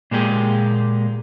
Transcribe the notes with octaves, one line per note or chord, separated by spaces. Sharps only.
A#2 G#3 A#3 G4 G#4